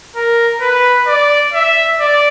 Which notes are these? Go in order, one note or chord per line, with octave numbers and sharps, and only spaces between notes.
A#4
B4
D5
E5
D5